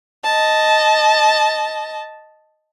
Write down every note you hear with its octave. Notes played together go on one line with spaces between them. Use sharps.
D#5 A5